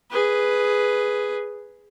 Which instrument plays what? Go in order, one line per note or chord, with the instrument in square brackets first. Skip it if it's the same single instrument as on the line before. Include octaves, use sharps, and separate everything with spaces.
[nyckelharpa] G#4 B4